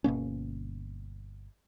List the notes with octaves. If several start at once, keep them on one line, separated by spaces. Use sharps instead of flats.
G1 B2 A#3 C#4